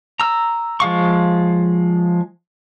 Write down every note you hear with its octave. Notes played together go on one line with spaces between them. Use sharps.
A#5 E6
F3 G#3 F5 C#6